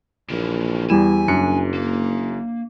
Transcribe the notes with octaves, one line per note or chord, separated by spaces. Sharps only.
A#1 E3 A#3
E2 G3 E4 G4 G#5 E7
F#1 F#2 D4 C#7
A#3